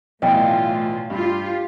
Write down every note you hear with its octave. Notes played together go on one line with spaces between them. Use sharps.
B1 A2 E3 F4 D5 D#5 G5
G2 F4 G4